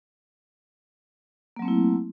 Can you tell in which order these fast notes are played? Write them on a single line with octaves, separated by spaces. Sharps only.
A#3 F#3 C4 A3 E4